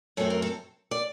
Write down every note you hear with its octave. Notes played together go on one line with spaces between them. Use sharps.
F#2 F#3 A3 C4 A4
A#4
A4
D5